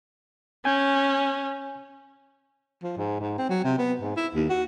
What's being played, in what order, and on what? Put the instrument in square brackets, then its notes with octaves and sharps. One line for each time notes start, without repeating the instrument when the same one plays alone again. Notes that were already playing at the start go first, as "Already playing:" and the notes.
[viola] C#4 [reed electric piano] G#5 G6
[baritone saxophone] F3
G#2
G#2
C4
F#3
C3
B3
G#2
E4
D#2
F#4